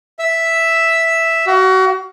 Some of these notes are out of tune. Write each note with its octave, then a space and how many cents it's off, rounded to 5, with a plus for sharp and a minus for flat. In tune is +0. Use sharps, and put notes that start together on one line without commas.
E5 +0 E6 +0
F#4 +30 F5 +0